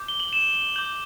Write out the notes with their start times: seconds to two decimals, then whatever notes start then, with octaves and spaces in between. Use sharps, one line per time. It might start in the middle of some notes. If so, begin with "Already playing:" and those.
Already playing: D6 G6
0.08 G7
0.20 F#7
0.33 E7
0.76 D6 G6 F#7